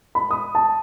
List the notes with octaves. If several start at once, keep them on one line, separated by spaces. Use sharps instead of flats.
B5
D#6
A5